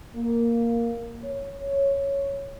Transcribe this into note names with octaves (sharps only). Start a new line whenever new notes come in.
A#3
C#5